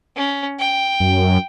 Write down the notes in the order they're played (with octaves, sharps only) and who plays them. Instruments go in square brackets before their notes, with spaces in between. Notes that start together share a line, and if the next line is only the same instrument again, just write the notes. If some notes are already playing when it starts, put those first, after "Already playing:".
[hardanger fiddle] C#4
G5
[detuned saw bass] F#2